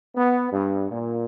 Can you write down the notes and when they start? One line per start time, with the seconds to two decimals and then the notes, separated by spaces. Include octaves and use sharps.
0.16 B3
0.52 G2
0.91 A#2